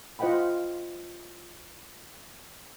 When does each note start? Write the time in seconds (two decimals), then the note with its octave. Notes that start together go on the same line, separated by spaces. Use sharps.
0.19 F4 C5 D#5 F#5 G5 B5